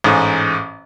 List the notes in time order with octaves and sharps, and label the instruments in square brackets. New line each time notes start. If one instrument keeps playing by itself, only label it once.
[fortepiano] A1 G#2